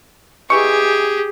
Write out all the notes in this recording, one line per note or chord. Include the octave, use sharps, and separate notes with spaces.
B2 E3 G4 G#4 C#6